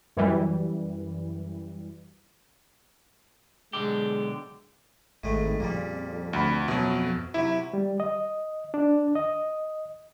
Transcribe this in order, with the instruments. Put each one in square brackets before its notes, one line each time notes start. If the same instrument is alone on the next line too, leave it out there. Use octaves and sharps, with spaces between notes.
[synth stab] F#2 E3 G3
[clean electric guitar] B1 D3 G4 [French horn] G#3
[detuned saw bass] G#1 [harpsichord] A2 G#3 A3
[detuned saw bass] F2 [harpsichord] A#2 C#3 G3
[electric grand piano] D2 B5
[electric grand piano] B2 F#3 [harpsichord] C#4 E4
[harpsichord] C3 F#3 [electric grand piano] E4
[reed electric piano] G3
D#5
D4
D#5